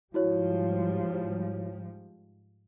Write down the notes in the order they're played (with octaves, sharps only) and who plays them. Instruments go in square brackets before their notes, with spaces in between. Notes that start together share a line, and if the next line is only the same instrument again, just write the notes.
[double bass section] G#2 F3 G3 [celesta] E4 F#4 C#5